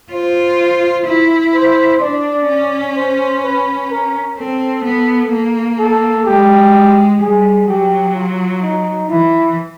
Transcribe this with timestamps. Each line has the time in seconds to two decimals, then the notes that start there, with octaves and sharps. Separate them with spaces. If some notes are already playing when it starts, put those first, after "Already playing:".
0.12 F4 C5
1.07 E4
1.54 C5
2.01 D4 D5
2.48 C#4
2.95 C5
3.43 B4
3.90 A#4
4.37 C4 A4
4.84 B3
5.32 A#3
5.78 A4
6.26 G#3 G4
7.20 G3 G#4
7.68 F#3 G4
8.15 F4
8.62 D#4
9.10 E3 E4